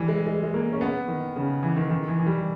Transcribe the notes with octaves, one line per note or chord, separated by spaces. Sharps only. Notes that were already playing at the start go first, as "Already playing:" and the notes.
Already playing: E3 G3
G#3
G#3
G#3
A#3
C#4
B3
D#3
C#3
E3
D#3
D#3
E3
E3
G3